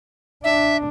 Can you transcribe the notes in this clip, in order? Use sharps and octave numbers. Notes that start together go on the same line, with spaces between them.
D4 E5